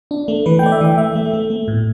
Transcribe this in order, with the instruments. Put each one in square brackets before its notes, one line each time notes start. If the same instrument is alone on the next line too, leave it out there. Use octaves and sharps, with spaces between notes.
[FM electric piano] D4
A3
E3 B4
G5
A3 D5
E5
E3 G5
A3 E5
A3
A3
A3
A2